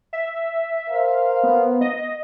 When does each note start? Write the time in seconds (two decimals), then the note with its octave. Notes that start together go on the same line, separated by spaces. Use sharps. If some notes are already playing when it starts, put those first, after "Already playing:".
0.13 E5
0.90 A#4 C5 F5
1.43 B3
1.81 D#5